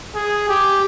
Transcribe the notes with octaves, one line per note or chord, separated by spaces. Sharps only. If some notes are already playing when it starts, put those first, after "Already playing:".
G#4
G4